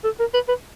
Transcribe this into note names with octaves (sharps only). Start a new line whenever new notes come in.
A4
A#4
B4
B4